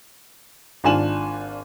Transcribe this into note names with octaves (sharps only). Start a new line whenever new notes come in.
G#1 D4 F4 G#5 E7 F#7